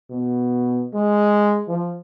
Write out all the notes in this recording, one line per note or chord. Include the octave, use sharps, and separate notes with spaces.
B2
G#3
F3